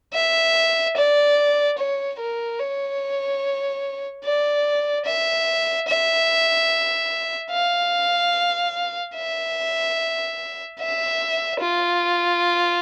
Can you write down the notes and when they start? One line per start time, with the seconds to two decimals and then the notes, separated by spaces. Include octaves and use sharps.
0.13 E5
0.96 D5
1.78 C#5
2.19 A#4
2.59 C#5
4.24 D5
5.05 E5
5.88 E5
7.51 F5
9.14 E5
10.79 E5
11.60 F4